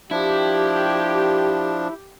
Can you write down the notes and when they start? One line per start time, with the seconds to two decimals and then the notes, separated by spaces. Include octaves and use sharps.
0.11 F3 D4 E4 G4